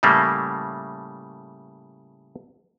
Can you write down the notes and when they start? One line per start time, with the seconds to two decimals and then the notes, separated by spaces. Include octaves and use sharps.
0.03 A2 C#3 G3 A3 A#3